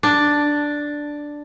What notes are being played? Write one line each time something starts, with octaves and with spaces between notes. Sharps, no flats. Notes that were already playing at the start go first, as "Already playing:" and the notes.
D4